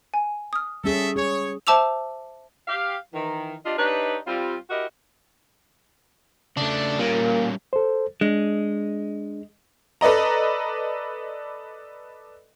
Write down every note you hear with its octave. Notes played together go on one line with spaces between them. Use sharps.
G#5
D#6 F6
G3 A3 C#4 G#4 A4 E5
G#4 C#5
C5 E5 A5 D6 E6 F7
G4 F5
D#3 E3
D4 F4 G4 D#5
D4 D#4 G4 B4 C#5 D#5
G3 C4 F4
E4 F#4 G4 A#4 D#5
C#3 A3 D4
A#2 G3 A#3 C#4
A4 C5
G#3 D4
A4 B4 D5 D#5 A#5